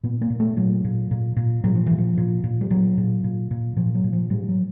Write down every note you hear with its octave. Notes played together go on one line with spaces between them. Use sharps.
A#2 B3
A#3
A#2
A3
A#2 F#3
A#2
A#2
A#2
A#2 F#3
F3
A#2 E3
F3
A#2
A#2
G3
A#2 F#3
A#2
A#2
A#2
A#2 F3
F#3
A#2
F3
A2 G3
F#3